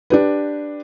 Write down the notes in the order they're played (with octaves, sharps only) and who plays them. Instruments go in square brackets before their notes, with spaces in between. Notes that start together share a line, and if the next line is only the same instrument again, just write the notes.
[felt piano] D4 G4 B4